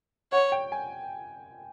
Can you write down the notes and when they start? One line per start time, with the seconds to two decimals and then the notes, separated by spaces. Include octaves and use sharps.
0.32 C#5 F#5
0.52 G5
0.72 G#5